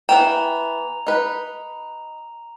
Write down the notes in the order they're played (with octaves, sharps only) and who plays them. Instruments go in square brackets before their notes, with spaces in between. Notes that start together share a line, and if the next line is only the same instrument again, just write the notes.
[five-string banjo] E3 B3 G5 [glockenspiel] A#5 F7
[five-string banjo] D#4 B4